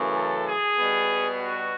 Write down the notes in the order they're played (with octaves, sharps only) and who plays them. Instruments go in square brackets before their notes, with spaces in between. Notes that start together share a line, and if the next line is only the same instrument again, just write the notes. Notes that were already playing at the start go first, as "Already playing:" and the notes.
Already playing: [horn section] F#2 C#3 E3 A3
A4
G#4
B2 G3 B3
F#4